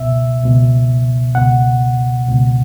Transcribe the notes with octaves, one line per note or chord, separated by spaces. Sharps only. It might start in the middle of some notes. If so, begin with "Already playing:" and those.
Already playing: C#2 B2 E5
C#2 B2
C#2 B2 F#5
C#2 B2